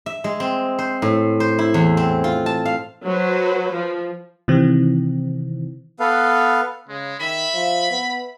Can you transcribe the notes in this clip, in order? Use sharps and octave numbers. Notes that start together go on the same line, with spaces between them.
E5
G#3
C4
C5
A2
C5
E4
E2
C4
F4
A5
F5
F#3 B4 C5
F3
C3 D#3 E3 C4
B3 A4 B4 F5
C#3 G#3
D#3 E5 B5
F3
B3